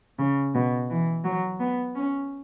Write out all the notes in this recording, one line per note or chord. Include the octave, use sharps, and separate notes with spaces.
C#3
B2
E3
F#3
B3
C#4